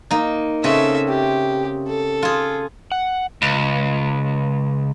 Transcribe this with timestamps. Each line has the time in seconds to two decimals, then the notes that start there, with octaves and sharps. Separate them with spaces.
0.11 A#3 D#4
0.64 C#3 C4 C#4 A4 E5
1.09 G4
1.88 A4
2.23 F4 G#4
2.92 F#5
3.42 C#2